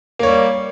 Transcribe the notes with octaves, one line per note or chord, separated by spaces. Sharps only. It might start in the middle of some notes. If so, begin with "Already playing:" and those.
G3 A#3 C#5